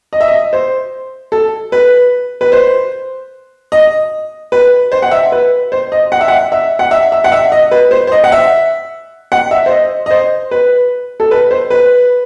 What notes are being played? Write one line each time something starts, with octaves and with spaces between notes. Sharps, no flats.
D#5
E5
D#5
C5
A4
B4
B4
C5
D#5
B4
C5
F#5
E5
B4
C5
D#5
F#5
E5
F#5
E5
F#5
E5
E5
F#5
E5
D#5
B4
C5
C5
D#5
F#5
E5
F#5
E5
C5
D#5
D#5
C5
B4
A4
B4
C5
B4